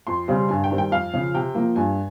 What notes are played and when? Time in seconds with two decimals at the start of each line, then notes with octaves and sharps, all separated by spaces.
0.07 F2 C6
0.28 C#3 G3 C4
0.49 G2 G#5
0.64 G5
0.71 D#3 G3 C4
0.78 G5
0.91 F2 F5
1.14 C#3 F3
1.34 C3 G5
1.55 F3 A#3
1.76 G2 G#5